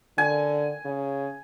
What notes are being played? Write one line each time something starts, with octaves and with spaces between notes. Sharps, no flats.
D3 G#5
C#3